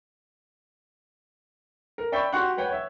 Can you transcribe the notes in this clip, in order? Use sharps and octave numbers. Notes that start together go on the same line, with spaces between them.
A#4
D5 E5 G5 B5 C#6
F#4 G4 F#5 C6 C#6 F#6
B4 C#5 F#5 G5
C#5 E5